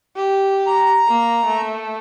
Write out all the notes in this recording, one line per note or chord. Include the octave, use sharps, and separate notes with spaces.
G4
A#5
A#3
A3